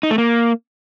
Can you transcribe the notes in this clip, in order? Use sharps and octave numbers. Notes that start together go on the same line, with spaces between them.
D#4
A3
A#3